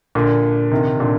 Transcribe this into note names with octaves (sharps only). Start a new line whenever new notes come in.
A#2 D3
C3 D#3
A#2 D3